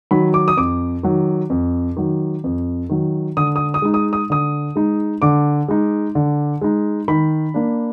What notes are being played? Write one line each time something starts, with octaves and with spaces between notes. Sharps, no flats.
D#3 F#3 B5
D6
D#6
F2 D6
D#3 F#3
F2
D#3 F#3
F2
D#3 F#3
D3 D#6
D#6
D#6
G#3 D#4
D#6
D#6
D3 D#6
G#3 D#4
D3 D6
G#3 D#4
D3
G#3 D#4
D#3 B5
A#3 D4